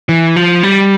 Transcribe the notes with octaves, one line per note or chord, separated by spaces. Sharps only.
E3
F3
G3